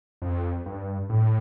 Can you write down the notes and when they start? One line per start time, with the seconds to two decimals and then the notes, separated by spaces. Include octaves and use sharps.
0.22 F2
0.66 G2
1.10 A2